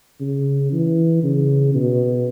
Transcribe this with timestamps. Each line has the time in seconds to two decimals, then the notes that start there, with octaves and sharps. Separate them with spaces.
0.21 C#3
0.72 E3
1.23 C#3
1.74 B2